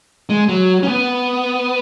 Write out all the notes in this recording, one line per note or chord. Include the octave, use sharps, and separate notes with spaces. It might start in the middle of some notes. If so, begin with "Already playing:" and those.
G#3
F#3
C#4
B3